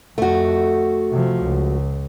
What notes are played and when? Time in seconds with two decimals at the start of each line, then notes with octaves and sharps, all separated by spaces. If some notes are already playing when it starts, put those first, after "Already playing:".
0.18 F2 A3 F#4
1.11 C3 F3
1.43 C#2